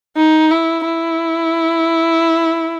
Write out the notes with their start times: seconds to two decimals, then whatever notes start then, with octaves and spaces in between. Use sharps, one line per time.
0.16 D#4
0.50 E4
0.85 E4